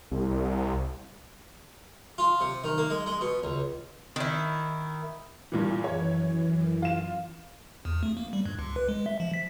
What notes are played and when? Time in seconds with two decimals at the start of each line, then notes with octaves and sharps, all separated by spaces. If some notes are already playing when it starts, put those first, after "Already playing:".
0.11 C2
2.18 F4
2.41 C3
2.64 D#3
2.78 A#3
2.90 G#3
3.06 G#3
3.21 B2
3.43 C#2
4.16 D#3 E4
5.52 G2 A#2 E3
5.84 F#2 E3 C#5
6.82 F4 E7
7.85 E2
8.03 A3
8.17 A#3
8.33 G3
8.46 G2
8.59 C#2
8.76 B4
8.89 G#3
9.06 E5
9.20 F3
9.34 B6